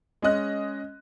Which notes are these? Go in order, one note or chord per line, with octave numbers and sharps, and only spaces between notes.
G#3 C#4 D#5 F#6